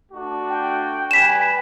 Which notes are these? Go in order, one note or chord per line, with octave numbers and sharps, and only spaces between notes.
A3 D4 F#4
G5
G3 B4 G#5 B6 E7